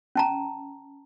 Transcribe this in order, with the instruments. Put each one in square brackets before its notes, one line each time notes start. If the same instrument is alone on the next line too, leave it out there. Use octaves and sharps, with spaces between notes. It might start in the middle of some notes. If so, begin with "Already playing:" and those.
[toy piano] C#4 A5 A#5